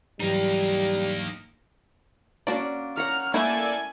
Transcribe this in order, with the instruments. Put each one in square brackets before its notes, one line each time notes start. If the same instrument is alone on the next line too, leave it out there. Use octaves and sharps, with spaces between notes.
[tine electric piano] G#2 E3 F#3 [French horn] G3 [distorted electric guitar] A#3 D#4
[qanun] A#3 C#4 F#4 [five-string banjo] D4 D5
[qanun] A#4 C#5 F#5 [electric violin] F6
[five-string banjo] A3 E4 [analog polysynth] A#3 A4 D5 [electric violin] G#5